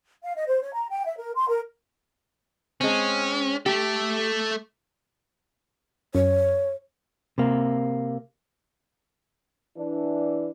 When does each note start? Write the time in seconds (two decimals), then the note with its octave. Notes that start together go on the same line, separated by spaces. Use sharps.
0.23 F5
0.36 D#5
0.47 C5
0.62 C#5
0.73 A#5
0.89 G5
1.06 E5
1.17 A#4
1.36 C6
1.48 A#4
2.81 G#3 C4 C#4
3.66 A3 G4 A4
6.15 F#2 C#5
7.38 C3 A#3
9.77 E3 D4